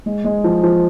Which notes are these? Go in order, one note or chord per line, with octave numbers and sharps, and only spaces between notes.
G#3
G#3
F3
F3